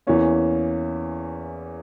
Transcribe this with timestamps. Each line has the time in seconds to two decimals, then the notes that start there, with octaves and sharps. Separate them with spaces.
0.07 E2 E3 A#3 C#4